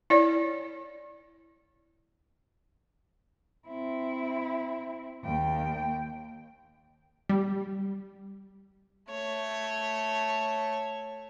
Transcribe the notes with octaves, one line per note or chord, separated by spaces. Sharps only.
E4 C#5 D5
C4 E4
D#2 G5
G3
A3 C#5